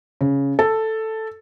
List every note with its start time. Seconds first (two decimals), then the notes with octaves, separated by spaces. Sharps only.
0.21 C#3
0.59 A4